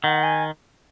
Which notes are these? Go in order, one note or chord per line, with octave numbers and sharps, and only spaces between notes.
D#3 F#5
G#5